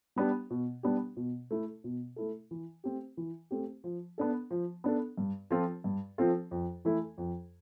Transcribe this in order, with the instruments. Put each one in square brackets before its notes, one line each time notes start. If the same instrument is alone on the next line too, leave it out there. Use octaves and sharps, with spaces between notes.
[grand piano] G3 B3 D4 G4
B2
G3 B3 D4 G4
B2
A3 E4 A4
B2
A3 E4 A4
E3
A3 C4 G4
E3
A3 C4 G4
F3
B3 D4 A4
F3
B3 D4 A4
G2
F3 C4 F4 A4
G2
F3 C4 F4 A4
F2
E3 A3 E4 A4
F2